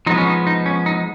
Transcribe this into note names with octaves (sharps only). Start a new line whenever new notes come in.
F3 G#3 B3 D#4
C#4
D#4
D#4
C#4
D#4